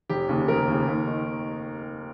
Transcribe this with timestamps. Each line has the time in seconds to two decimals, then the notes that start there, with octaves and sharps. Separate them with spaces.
0.09 F1 G4
0.29 D#2 C#3
0.48 F1 A#4
0.67 D#2 C#3
0.87 D#2
1.07 D#3